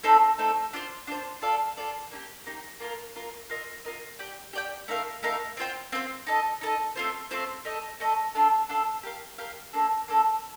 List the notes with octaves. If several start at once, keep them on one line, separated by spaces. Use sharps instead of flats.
A3 C4 D#4 A4
A3 C4 D#4 A4
D4 F4 C5
D4 F4 C5
F4 A4 D5 F5
F4 A4 D5 F5
A#3 D#4 G4
A#3 D#4 G4
A#3 F4 A#4
A#3 F4 A#4
F4 A#4 D#5
F4 A#4 D#5
G4 D5 G5
G4 D5 G5
A3 D#4 A#4 F5
A3 D#4 A#4 F5
C4 F4 C5 G5
C4 F4 C5 G5
D#4 A4 D#5
D#4 A4 D#5
A3 C4 F4 C5
A3 C4 F4 C5
A3 D#4 A4 D#5
A3 D#4 A4 D#5
D4 F4 A4
D4 F4 A4
G4 A#4 F5
G4 A#4 F5
A#3 D4 A4
A#3 D4 A4